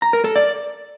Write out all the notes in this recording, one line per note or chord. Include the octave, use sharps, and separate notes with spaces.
A#5
A#4
A4
D5